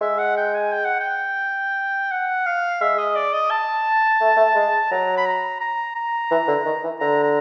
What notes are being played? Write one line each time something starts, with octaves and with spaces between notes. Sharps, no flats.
G#3 E5
F#5
G5
G#5
G5
F#5
G5
F#5
F5
G#3 E5
D#5
D5
D#5
A5
A3
A3
G#3
F#3 A#5
B5
A#5
A#5
A#5
E3
D3
D#3
E3
D3 A#5
A#5